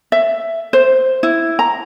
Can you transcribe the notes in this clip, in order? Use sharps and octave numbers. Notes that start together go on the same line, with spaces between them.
E5
C5
E4
A#5